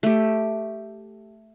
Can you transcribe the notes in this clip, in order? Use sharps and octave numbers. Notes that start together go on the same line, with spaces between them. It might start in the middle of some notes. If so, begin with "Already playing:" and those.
A3 G4